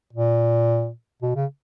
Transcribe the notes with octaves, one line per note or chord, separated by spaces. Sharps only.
A#2
B2
C#3